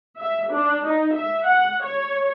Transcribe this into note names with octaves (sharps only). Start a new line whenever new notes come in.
E5
D4
D#4
E5
F#5
C#5